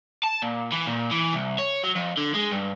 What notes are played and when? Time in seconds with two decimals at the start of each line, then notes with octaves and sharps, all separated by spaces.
0.24 A5
0.42 A#2
0.72 E3
0.87 A#2
1.11 E3
1.33 C2
1.59 C#5
1.83 F#3
1.95 F2
2.17 D3
2.34 G#3
2.51 G2